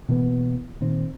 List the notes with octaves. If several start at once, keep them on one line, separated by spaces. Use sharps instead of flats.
B2 E3 A#3 B3
A#2 D#3 C4